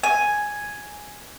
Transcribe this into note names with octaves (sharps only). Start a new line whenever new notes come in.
G#5